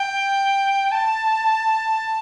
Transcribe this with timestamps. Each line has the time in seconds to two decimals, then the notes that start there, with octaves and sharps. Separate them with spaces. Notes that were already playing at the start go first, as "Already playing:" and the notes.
Already playing: G5
0.91 A5